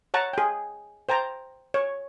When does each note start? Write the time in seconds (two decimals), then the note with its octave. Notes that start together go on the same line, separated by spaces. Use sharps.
0.14 C#5 F#5 A5 A#5
0.33 G#4 G5
1.09 C5 G5 A5 A#5
1.74 C#5